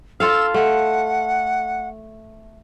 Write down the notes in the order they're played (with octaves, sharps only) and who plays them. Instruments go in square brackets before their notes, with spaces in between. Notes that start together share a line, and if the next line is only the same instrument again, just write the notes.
[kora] F4 A4 F5 [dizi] E6
[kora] A3 [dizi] F#5